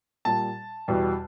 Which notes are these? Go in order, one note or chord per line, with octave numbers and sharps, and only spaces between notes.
A#2 G3 A5
E2 B2 G3